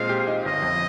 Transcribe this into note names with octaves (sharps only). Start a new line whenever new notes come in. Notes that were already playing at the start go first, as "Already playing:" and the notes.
Already playing: A#2 G#3 C4 F5
G4
D#4
G1 D#5
F2